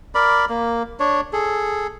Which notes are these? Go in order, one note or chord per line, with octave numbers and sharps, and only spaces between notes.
A#4 D5 B5
A#3
D4 C#5
G#4 A4